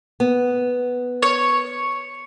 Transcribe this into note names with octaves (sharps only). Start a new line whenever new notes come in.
B3
C#5